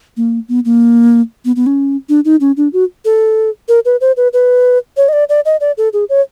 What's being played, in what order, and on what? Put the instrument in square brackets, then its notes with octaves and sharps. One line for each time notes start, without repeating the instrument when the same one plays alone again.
[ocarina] A#3
B3
A#3
B3
B3
C#4
D4
D#4
C#4
D4
F#4
A4
A#4
B4
C5
B4
B4
C#5
D#5
D5
D5
D#5
D5
A4
G#4
C#5